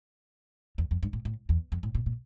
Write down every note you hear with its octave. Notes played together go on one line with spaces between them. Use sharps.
E2
F2
G2
A2
A2
E2
F2
A2
A#2
A#2